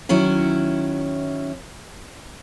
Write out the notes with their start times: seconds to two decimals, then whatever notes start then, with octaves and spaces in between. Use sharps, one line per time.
0.09 D#3 F#3 C#4 E4